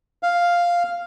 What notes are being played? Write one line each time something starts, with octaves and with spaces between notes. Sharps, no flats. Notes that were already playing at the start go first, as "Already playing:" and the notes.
F5